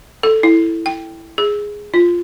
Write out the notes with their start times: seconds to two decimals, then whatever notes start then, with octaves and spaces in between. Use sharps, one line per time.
0.23 A4
0.43 E4
0.86 G5
1.38 G#4
1.94 F4